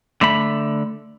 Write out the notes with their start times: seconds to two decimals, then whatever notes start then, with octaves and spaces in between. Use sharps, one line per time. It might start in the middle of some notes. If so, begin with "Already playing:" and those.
0.21 D3 A3 B5